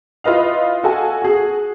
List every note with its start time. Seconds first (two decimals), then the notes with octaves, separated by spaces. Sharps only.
0.24 E4 F4 B4 D#5 F5
0.83 F#4 A4 G#5
1.22 F#4 G#4